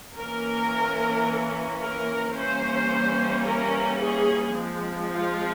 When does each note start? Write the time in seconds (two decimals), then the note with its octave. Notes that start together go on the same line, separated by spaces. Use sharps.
0.15 E3 A#3 C#4 A#4
1.80 A#4
2.35 E3 G3 A#3 C#4 C5
3.45 A#4
4.00 G#4
4.55 F3 G#3 C4
5.10 F4